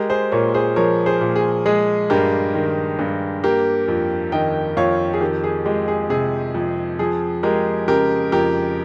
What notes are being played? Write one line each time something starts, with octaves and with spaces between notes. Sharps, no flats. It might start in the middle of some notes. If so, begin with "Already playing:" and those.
Already playing: G#3 G4 A#4
G#4 C5
A#2 A#4 C#5
G#4 C5
F3 A#4 C#5
G#4 C5
A#2
G#4
G#3 G#4
G2 G4 A#4
D#3
G2
A#3 G4 A#4
F2
D#3 D#5 G5
F2 C#5 F5
G#4
D#3 G4
G#4
G#3 G4
G#4
C3 G#4
F2
F3 G#4
G#3 G4 A#4
C#3 G4 A#4
F2 G4 A#4